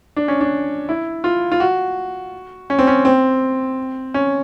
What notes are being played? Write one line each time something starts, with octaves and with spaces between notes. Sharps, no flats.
D4
C#4
D4
E4
F4
F4
F#4
C#4
C4
C#4
C4
C#4